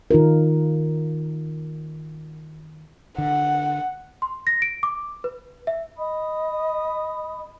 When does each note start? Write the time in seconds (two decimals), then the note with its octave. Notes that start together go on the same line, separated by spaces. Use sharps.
0.11 D#3 D#4 F4 A#4
3.18 D3 F#5
4.22 C6
4.47 A#6
4.62 D7
4.83 D6
5.24 B4
5.67 E5
5.97 D#5 B5 D#6